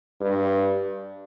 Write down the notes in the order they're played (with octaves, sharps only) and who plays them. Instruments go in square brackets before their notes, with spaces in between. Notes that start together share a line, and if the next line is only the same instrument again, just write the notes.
[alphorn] G2